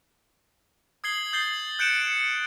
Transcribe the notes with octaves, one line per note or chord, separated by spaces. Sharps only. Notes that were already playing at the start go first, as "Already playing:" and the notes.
D#6 G#6 C7 F#7 G7
D#6 G6 A6 C7 G7
F#6 G6 C#7 D7 E7 G7